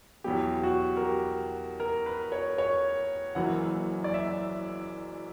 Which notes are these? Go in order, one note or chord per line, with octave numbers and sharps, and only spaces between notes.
E2 B2 F#3 B3 G4
F#4
A#4
G4
A#4
B4
C#5
C#5
F#1 F#2 E3 A#3 F#5
D5
E5